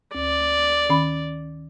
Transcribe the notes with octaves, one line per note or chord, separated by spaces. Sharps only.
D2 D5
D#3 C#4 B5